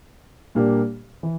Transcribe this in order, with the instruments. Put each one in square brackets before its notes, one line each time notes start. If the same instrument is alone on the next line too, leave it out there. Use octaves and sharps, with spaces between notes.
[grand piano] A#2 G3 A#3 D4 G4
E3